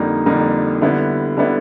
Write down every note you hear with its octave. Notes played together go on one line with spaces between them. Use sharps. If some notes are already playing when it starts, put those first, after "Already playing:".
Already playing: F2 D3 G3 A#3 D#4
F2 D3 G3 A#3 D#4
D3 G3 B3 E4
D3 G3 B3 E4